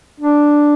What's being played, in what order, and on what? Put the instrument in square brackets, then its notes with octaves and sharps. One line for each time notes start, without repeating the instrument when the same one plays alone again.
[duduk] D4